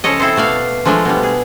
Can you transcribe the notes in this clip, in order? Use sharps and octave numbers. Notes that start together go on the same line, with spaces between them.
C#3 F3 A4 C#5 D#5
C4 E4 A4 C5
B2 A3 D5 F5
F3 G#3 A3 D4
B2 G3
G#4